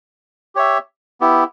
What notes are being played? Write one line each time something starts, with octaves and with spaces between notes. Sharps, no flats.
G4 C#5 E5
B3 E4 G4